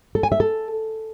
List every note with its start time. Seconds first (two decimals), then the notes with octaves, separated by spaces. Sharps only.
0.15 A4
0.23 G#5
0.32 E5
0.40 A4